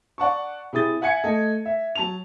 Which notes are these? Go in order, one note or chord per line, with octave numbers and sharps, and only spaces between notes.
D5 F#5 A5 C#6
C3 E4 G#4 D#6 A6 G7
E5 F#5 G#5 G#6 C#7
A3 A4 D#5
E5
F#3 A5 F7